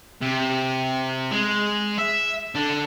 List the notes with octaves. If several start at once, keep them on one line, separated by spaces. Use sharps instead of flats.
C3
G#3
E5
D3